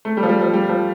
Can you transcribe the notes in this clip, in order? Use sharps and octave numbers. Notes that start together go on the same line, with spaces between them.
A3
G3
F3
G3
F3
G3
F3